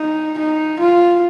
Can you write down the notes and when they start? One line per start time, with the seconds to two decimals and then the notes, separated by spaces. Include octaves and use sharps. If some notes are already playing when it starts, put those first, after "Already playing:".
Already playing: D#4
0.38 D#4
0.79 F4